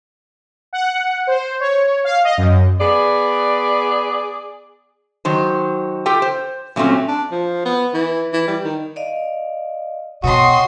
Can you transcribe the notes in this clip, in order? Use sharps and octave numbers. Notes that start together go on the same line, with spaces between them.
F#5
C5
C#5
F5
D#5
F#2
B3 G#4 D5
D#3 F#3 C5
F4 G4 A4 G5
C5
A#2 F#3 A3 C4 C#4
D4
F3
B3
E3
E3
G3
D#3
D5 D#5 F5
B2 F#4 C#5 D#5 G5 C6 D#6